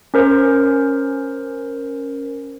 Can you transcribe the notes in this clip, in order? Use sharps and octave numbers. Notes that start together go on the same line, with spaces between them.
C#4 A#4 C5